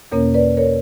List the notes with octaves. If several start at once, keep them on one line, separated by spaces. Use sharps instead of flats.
E2 B2 A#3 C#4 A#4 C#5
B4 D5
A#4 C#5